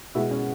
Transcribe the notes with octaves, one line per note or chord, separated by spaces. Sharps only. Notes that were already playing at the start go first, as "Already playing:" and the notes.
B2 G#3 E4
C#4